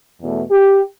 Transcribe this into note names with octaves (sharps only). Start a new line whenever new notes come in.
E2 B2 A3
G4